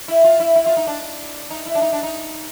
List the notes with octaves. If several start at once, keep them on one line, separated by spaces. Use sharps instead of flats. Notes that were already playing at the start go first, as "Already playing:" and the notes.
E4
F4
E4
E4
F4
D#4
D4
D#4
E4
D4
D#4
D4
D#4